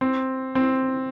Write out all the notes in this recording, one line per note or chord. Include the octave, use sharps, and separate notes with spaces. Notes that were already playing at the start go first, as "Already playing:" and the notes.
C4
C4